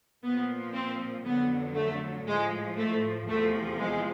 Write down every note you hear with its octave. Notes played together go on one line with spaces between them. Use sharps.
A#2 F3 B3
C4
F2 D3 F#3 B3
A3
A2 F3 G#3
A3
E2 C3 F3 A3
G#3